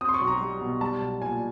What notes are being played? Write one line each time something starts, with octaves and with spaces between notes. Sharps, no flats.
C4 D#6
C6
C#6
B1
A#5
G3
B2
G3 A5
B1
A#2 G#5